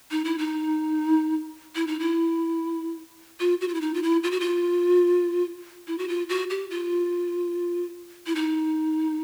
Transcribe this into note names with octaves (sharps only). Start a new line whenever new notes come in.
D#4
E4
D#4
E4
D#4
E4
F4
F#4
F4
E4
D#4
F4
E4
F4
F#4
F4
E4
F#4
F4
F#4
G4
F4
E4
D#4